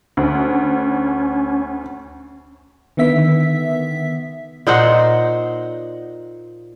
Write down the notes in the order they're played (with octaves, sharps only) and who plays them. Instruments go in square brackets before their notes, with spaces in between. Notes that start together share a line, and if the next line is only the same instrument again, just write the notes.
[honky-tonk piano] D2 [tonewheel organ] C#4
[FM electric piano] D3 D#3 B3 E5 B6
[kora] A#2 D#4 C5 F#5